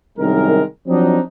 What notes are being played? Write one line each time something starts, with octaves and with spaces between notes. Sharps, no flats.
C2 F#2 D#3 G#3 A#4
F3 F#3 C4 D4 D#4